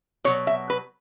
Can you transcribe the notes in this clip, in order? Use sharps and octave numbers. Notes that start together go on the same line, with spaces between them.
B2 F#3 C#5
E5
B4